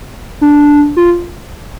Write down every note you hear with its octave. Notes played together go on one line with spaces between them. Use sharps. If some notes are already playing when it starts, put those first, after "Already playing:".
D4
F4